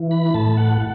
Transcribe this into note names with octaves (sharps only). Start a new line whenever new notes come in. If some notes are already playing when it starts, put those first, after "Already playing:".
Already playing: E3
B5
A2 A5
F#5